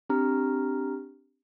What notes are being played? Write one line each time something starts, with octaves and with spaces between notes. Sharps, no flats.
C4 D4 G4 A#5 F6